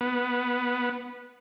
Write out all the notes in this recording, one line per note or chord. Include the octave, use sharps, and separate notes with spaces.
B3